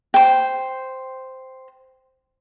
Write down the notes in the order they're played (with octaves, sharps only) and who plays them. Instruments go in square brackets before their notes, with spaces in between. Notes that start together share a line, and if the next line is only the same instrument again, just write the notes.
[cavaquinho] C5 G5